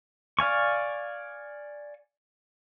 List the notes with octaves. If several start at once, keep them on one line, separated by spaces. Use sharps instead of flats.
D5 F5 G#5 C#6